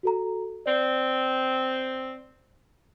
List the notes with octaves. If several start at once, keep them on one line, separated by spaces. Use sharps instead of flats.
F#4 A4 A#5
C4 D5